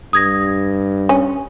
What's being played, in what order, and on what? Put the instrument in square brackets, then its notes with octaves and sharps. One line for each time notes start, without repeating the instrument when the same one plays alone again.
[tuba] G2 [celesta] D#6 G#6 A#6
[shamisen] C#4